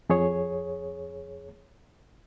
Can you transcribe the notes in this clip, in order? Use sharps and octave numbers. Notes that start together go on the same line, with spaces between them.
F2 G#4 C#5